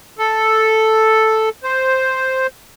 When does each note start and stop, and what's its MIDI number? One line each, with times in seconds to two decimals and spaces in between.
0.18 1.49 69
1.63 2.47 72